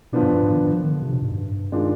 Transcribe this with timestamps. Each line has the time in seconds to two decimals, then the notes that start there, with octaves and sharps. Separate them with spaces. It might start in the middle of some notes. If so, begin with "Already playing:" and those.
0.12 B2 D3 F3 B3 D4
0.22 G2
0.33 G2
0.43 G#2
0.52 D#3
0.62 D#3
0.72 F3
0.83 D#3
0.92 D3
1.02 C3
1.12 B2
1.22 G#2
1.32 G2
1.72 D#3 G#3 D4 F4